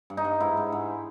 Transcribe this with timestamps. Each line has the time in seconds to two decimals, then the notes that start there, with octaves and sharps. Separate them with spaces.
0.10 G2
0.17 D#4
0.25 G2
0.40 G#2 E4
0.57 G#2
0.72 G#2